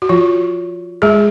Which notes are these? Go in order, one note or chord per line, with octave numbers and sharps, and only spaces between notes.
F#4
F3 F4
G#3 G#4